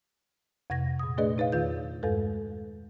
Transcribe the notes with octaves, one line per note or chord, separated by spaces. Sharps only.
F2 C3 F#5 G#6 A#6
A#2 D#6
A3 D4 G#4 B4 D5 D#5
D#4 B4 C#5 F5
E2 D#3 F4 B4 G6
E2 G2 G#3 A4 B4